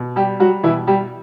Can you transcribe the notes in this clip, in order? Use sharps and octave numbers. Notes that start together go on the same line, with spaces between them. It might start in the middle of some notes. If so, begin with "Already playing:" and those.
Already playing: B2
G3 G4
F#3 G3 F#4
B2 E3 E4
G3 G4